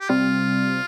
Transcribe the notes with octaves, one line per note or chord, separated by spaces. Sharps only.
G4
C3 G3 C4 F4